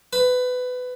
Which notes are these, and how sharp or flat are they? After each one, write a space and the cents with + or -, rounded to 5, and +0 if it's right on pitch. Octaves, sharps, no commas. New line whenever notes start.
B4 +20